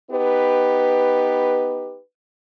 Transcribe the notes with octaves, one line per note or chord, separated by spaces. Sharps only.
B3 D#4 G4 B4